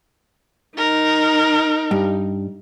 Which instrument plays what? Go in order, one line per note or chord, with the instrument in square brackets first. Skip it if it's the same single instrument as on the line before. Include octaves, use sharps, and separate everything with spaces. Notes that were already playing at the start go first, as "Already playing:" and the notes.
[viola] D#4 [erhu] A#4
[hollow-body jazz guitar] G2